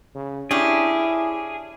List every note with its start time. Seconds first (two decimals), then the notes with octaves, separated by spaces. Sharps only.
0.15 C#3
0.51 C#4 D4 E4 G4 G#4